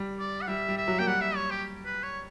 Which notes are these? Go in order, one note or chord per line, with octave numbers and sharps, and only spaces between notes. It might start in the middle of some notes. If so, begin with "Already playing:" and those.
Already playing: G3
D5
F#5
G3 E5
G3
E5
F#3
A#3 G5
G3 F#5
E5
C#5
G4
B4
C#5